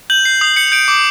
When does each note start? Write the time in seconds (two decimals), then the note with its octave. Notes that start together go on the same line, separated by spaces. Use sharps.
0.10 G6 F#7
0.25 G6 C7
0.41 D#6 C7
0.56 G6 C#7
0.68 C#7
0.72 G6 D7
0.88 D6